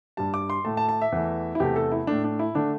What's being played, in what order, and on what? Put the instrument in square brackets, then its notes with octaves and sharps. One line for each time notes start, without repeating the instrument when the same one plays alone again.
[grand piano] G2 G3 A5
D6
C6
A2 A3 A5
A5
A5
E5
E2 E3 A3
E4
E2 C3 A3 G4
A4
E4
A2 A3 D4
D4
E4
D3 A3 D4